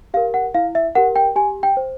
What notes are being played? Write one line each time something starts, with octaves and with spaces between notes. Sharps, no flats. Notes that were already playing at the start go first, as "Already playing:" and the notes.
G4 A#4 F5
F#5
E4 F5
E5
G4 A#4 F#5
G5
G4 G#5
G5
C5